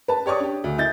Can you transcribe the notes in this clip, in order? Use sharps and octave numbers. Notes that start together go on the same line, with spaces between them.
B4 A5
G4 C#5 D5 C#6 D#6
D4 G4
D2
E4 G6 A6